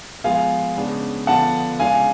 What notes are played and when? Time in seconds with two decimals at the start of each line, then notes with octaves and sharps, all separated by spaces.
0.24 F3 G#3 B3 F4 F5 G#5
0.76 C#3 G#3 B3 D4
1.27 D3 F3 B3 D4 F4 F#5 A5
1.79 C#3 G#3 D4 F4 F5 G#5